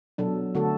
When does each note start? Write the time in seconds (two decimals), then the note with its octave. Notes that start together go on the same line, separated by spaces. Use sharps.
0.18 B2 F#3 D4 A4
0.55 D3 A3 F#4 A4